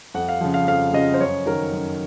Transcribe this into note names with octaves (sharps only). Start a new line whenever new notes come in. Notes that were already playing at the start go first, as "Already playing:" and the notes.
F2 F#5
F5
C#3 F3
F5
F2 F5
C#3 F3 D#5
C5
F#2 C#5
D#3 F#3 A#4
F#2